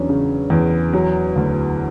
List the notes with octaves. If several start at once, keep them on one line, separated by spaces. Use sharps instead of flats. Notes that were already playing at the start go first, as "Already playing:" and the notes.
Already playing: E2 F#3 C#4 D4
C#3
E2
F#3
D2